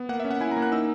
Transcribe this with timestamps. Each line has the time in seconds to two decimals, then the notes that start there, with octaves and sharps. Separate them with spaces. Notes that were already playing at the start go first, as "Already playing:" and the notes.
Already playing: B3
0.09 A#3 F#5
0.20 E5
0.25 C#4
0.31 F#5
0.41 E4 G#5
0.51 A#5
0.57 A#3
0.62 F#6
0.72 D#4 E6